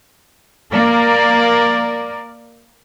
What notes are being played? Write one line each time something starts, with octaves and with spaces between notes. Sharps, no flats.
A#3 A#4 D5